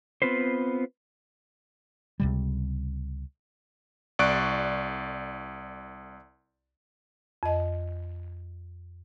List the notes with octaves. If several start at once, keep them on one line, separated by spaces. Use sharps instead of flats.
B3 C4 F4 B4 C5
C#2 C3 G3
C2 D5 C#6 F#6 D7
F2 D#5